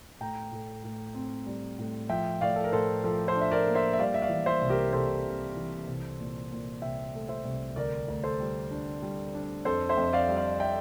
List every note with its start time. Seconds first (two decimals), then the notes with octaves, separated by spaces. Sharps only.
0.20 A2 G5 A#5
0.52 A2
0.84 A2
1.14 C4
1.46 G3
1.78 A2
2.09 F3 E5 G5
2.41 A2 D5 F5
2.56 A4
2.64 A#4
2.72 A2 A4 C5
3.04 F3 A4
3.28 A4 C5
3.36 D4
3.41 E5
3.51 A#4 D5
3.67 A#3
3.75 C5 E5
3.93 E5
3.99 G3 D5 F5
4.14 E5
4.22 D5 F5
4.30 E3
4.46 C5 E5
4.61 C2
4.69 G4 A#4
4.93 C2 A4 C5
5.24 C3
5.56 E3
5.87 C2
6.19 A#2
6.51 A#2
6.82 C2 E5 G5
7.14 A3
7.29 C5 E5
7.45 C2
7.76 D2 A#4 D5
8.08 D2
8.24 A4 C5
8.40 G3
8.71 D4
9.02 G3
9.34 D4
9.65 F2 A4 C5
9.89 C5 E5
9.97 F2
10.13 D5 F5
10.29 G3
10.37 D5 F5
10.60 E5 G5